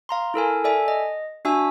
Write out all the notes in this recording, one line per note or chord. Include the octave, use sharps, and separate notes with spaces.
F5 A#5 C6
E4 A4 A#4 G#5
A4 D5 E5 G#5
D#5
D4 F#4 E5 G#5 E6